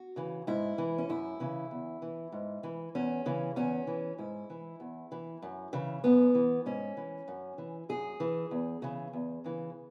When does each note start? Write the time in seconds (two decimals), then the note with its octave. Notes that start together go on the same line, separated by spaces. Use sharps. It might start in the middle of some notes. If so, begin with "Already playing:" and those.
Already playing: F#4
0.16 C#3 E3
0.47 G#2 E4
0.78 E3
0.98 C#4
1.09 F#2 E4
1.40 C#3 E3
1.71 E2
2.02 E3
2.32 G#2
2.63 E3
2.95 E2 C#4
3.26 C#3 E3
3.56 E2 C#4
3.87 E3
4.18 G#2 E4
4.50 E3
4.80 E2
5.12 E3
5.42 F#2
5.73 C#3 E3
6.04 F#2 B3
6.35 E3
6.66 G#2 C#4
6.97 E3
7.28 F#2
7.58 E3
7.89 F#2 G#4
8.20 E3
8.51 E2
8.82 C#3 E3
9.13 E2
9.44 C#3 E3